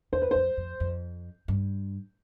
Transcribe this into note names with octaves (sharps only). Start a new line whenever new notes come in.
E2 C5
B4
F2 C5
F2
F2
G2